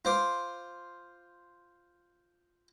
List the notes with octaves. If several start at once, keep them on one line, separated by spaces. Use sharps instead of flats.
F4 C5 D6